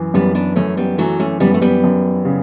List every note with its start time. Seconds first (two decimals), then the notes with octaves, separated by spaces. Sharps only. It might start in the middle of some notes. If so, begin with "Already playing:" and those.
Already playing: F#2 E3
0.14 F#2 G3 B3
0.35 B3 D4
0.56 F#2 A3 C#4
0.77 G3 B3
0.98 E3 F#3 A3
1.19 A3 C#4
1.40 F#2 G3 B3
1.54 A3
1.62 G3 B3
1.84 F#2
2.25 C#3